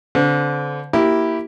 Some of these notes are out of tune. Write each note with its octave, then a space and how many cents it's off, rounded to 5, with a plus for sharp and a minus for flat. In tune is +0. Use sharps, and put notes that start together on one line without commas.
D3 -30 C4 -30
A#3 +0 E4 +0 G4 -10